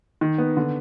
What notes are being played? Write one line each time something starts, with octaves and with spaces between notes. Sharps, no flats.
D#3
B3
D3